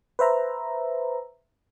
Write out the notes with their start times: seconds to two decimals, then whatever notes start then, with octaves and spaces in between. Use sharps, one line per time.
0.19 B4 C5 E5 A#5